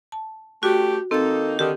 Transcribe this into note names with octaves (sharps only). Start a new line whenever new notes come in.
A5
A3 C#4 F#4 G4
D#3 A#3 C4 D#4 A4 A6
D3 D#3 G4